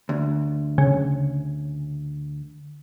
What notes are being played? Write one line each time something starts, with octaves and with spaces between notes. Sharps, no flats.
D2
C#3